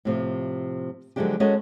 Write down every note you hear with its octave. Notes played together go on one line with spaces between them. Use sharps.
A2 C3 F3
D3 F3 F#3 G#3 D4 G4
G#3 C#4 F#4 A4 A#4 D#5